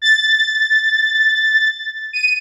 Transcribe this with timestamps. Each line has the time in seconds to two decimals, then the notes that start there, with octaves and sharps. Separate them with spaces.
0.02 A6
2.13 D#7